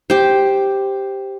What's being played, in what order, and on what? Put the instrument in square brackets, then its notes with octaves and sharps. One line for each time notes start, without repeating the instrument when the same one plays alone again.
[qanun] G4 C5